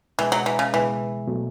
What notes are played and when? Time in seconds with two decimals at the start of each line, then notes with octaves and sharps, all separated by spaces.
0.19 C#2 B2 E3 G#3
0.32 F#3
0.46 E3
0.59 C#3
0.74 C#2 B2 E3 G#3
1.27 B2 F#3 A3